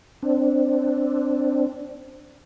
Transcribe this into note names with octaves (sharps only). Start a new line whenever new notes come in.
C4 D4